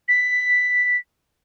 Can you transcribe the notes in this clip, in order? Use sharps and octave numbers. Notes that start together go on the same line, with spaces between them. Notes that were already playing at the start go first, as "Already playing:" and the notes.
B6